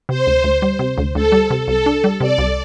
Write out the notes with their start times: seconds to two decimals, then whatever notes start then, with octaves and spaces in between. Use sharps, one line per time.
0.09 C3 C5
0.27 D2
0.44 D2
0.62 G3
0.79 C3
0.98 D2
1.15 D2 A4
1.32 G3
1.50 C3
1.68 C2 A4
1.86 D4
2.04 G3
2.20 C3 D5
2.38 C2